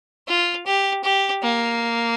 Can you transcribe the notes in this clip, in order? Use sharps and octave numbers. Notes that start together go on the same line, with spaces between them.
F4
G4
G4
A#3